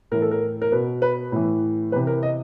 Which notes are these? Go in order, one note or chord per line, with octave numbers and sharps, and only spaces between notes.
A2 E3 A#4
A4
A#4
A#4
B2 B4
B4
A2 E3
C3 E3 B4
A#4
D#5